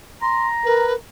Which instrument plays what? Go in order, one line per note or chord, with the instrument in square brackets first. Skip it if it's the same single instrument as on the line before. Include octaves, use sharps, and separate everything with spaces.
[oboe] A#5 [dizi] C6
[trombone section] A#4 [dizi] B4